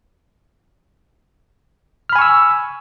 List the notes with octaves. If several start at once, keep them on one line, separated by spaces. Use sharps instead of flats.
G#5 B5 C#6 E6 F6